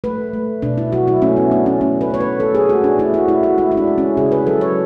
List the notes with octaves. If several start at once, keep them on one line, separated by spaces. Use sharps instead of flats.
A3 B4
A3
B2 D4
E4
F#3 F#4
E4
A3 C#4
B3
A3 D4
C#4
A3 C#4
B4
A3 C#5
B4
A3 A4
G#4
A3 F#4
D4
A3 E4
F#4
A3 E4
F#4
G#3 E4
E4
D4
G#3
C#4
C#3 G#4
B4
F#3 A4
C#5